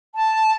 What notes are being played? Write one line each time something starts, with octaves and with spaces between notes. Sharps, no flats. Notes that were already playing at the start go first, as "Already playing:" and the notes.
A5